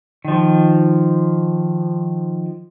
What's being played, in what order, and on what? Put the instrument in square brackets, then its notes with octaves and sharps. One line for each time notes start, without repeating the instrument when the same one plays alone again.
[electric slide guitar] D#3 F3